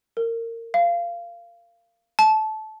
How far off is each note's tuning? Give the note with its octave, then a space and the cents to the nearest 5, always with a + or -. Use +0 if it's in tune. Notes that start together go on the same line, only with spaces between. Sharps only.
A#4 -25
F5 -20
A5 -20